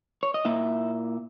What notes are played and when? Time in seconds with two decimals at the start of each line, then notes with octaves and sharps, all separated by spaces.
0.23 C#5
0.34 D#5
0.45 A#2 A#3 E4 E5